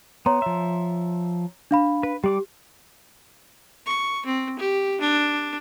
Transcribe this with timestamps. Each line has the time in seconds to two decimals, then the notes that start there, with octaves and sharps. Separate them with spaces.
0.26 B3 C#5 A#5 C6
0.42 F3 E5
1.71 D4 F5 B5
2.03 B4
2.24 G3 G4 D5 D6
3.86 C#6
4.25 C4
4.59 G4
5.00 D4